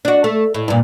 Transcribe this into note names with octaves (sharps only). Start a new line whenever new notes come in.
D4 F#4
A3
A2
G2 A#2